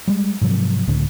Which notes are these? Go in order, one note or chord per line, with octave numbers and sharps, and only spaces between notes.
G3 G#3
G#2 C3 F3 F#3
C#2 A2 D3